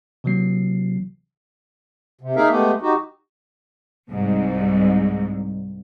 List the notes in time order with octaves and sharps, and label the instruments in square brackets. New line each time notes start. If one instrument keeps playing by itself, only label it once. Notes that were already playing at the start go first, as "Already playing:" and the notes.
[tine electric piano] C3 E3 F#3 A#3 C7
[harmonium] C3
A#3 D#4 G#4 A#4 E5 F5
G#3 A3 B3 G4
D#4 F#4 G4
[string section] C2 G#2